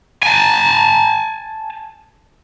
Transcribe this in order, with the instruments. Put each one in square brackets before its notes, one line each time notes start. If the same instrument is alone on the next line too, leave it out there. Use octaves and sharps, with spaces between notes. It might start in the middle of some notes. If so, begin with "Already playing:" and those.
[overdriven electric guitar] G#5 A5